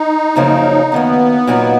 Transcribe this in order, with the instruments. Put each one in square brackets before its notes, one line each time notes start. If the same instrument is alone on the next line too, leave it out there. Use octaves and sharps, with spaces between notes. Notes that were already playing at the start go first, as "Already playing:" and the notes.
Already playing: [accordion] D#4
[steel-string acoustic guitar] F#2 C#3 F3 A#3 C#4
[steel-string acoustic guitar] F#2 D#3 A#3 [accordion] B3
[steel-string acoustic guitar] A#2 F#3 A#3 D#4 F#4